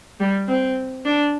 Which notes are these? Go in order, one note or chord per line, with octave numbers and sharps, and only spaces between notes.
G3
C4
D4